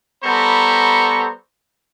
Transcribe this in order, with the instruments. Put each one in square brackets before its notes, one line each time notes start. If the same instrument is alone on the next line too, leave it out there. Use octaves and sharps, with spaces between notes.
[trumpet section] G3 B3 A4 C5 A#5 C#6